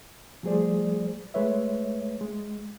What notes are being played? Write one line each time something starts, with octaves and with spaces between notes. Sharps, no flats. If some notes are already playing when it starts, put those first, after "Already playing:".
F3 G3 A3 G#4 C5 D5
G#3 A3 B4 C#5 E5
G#3